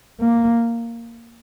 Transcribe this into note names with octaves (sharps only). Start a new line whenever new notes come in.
A#3